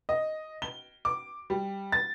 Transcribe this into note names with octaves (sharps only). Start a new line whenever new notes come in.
D#5
G7
D6
G3
A6